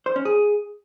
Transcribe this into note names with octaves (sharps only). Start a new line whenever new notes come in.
C5
C#4
G#4